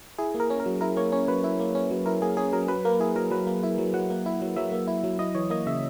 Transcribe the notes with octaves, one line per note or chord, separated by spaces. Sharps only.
E4 G#4
A#3
A#4
C#4
A#4
F#3
E4 A#4
A#3 C#5
C#4 C#5
F#3 B4
E4
A#3
C#4
F#3
E4 A#4
A#3 G#4
C#4 G#4
F#3 A#4
F#3 B4
A#3 A#4
E4 G#4
F#3 A#4
F#3 B4
A#3
E4
F#3
F#3 F#5
A#3
E4
F#3
F#3 E5
A#3
E4
F#3
E4 D#5
E3 C#5
A#3 D#5
C#3 E5